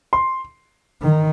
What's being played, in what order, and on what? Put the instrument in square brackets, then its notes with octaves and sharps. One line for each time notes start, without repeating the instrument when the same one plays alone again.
[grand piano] C6
[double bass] D#3